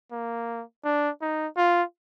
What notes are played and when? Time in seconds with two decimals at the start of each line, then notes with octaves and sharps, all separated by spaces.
0.12 A#3
0.84 D4
1.22 D#4
1.57 F4